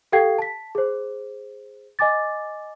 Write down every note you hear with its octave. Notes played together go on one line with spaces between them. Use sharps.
G4 A4 F5 G5 G#6 C7
A5 B6
G#4 C5
D#5 G#5 D6 A6